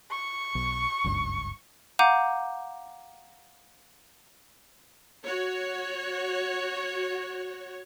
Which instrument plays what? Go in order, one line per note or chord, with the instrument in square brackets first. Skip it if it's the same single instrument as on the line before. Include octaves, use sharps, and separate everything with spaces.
[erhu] C#6
[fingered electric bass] B1
F#1 C#2 G2
[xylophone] F5 F#5 A#5 D6 G6 D#7
[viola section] F#4 C#5